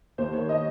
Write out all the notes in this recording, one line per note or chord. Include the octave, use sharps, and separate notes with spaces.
D#2 C5
D#3 C#5
D#5